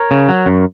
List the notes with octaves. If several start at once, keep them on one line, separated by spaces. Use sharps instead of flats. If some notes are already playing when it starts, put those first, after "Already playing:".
Already playing: A#4 C#5
C#3
F#3
F#2